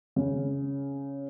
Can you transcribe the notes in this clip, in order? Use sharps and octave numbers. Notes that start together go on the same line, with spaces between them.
C#3